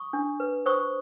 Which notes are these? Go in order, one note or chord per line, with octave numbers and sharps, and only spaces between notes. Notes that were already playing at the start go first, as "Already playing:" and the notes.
Already playing: C#6 D#6
D4
B4
C5 C#6 D#6